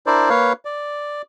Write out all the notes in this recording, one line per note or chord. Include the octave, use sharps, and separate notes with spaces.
D4 E4 A#4 C5 D5
A#3 B4 C#5 F5
D5